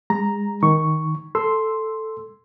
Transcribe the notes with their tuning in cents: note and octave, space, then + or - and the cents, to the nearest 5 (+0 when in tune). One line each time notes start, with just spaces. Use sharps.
G#3 -30 A#5 +0
D#3 +10 C#6 +0
A4 +0 C6 +0 E6 +0